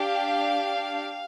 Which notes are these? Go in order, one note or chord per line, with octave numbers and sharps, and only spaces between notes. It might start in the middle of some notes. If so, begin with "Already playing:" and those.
Already playing: D4 G4 F5